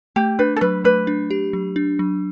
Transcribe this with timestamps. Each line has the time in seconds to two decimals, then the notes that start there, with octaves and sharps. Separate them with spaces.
0.16 A3 G4
0.39 D4 B4
0.56 A4
0.61 F#3 B4
0.84 A3 B4
1.07 D4
1.31 G4
1.53 F#3
1.76 D4
1.99 F#3